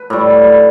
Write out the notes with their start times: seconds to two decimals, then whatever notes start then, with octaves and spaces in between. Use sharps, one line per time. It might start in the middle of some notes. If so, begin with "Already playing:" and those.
Already playing: B4
0.10 A2 G3